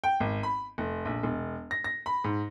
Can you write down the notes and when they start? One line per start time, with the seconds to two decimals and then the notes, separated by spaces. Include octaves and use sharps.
0.04 G5
0.20 G#1
0.43 B5
0.78 F1
1.05 A#1
1.23 E1
1.71 A#6
1.84 A#6
2.06 B5
2.24 G#2